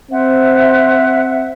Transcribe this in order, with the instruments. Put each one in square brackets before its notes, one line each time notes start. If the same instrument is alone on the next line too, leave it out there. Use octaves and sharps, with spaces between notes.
[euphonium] C4 [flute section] C5 E5 F#5